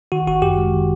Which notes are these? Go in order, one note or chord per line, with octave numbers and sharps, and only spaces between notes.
D#3 F#4
G1 F#4
F#2 G4
G#3
D#3